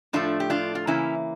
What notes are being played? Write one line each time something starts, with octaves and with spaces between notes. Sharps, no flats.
A2 F3 A3 D4 F4
G4
D4 F4
F4
C#3 E3 A#3 C#4 E4